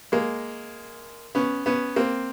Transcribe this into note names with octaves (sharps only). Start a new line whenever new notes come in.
G#3 A#3
B3 C#4
B3 C#4
A#3 C4